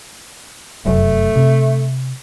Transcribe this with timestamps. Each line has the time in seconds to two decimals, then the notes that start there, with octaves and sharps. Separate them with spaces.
0.85 F1 F#2 A3
1.36 C3